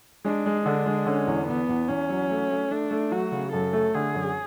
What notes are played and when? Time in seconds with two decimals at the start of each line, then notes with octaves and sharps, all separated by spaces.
0.25 G#3 D4
0.46 G#3
0.66 D3 D4
0.86 G#3
1.06 D3 C#4
1.27 E2
1.48 E2 B3
1.69 E2
1.89 E2 C#4
2.09 F#3
2.31 A3
2.51 A3
2.71 A3 D4
2.91 A3
3.12 F#3 F#4
3.32 C#3
3.53 F#2 A4
3.73 A3
3.95 D3 G#4
4.14 F#2